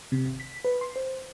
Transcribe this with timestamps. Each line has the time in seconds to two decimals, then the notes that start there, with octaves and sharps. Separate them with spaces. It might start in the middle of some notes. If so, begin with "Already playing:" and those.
0.12 C3
0.25 G#1
0.40 B6
0.65 B4
0.81 C6
0.96 C5